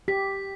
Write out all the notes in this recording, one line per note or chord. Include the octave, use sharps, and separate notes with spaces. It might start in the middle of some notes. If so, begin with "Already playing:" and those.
G4 B6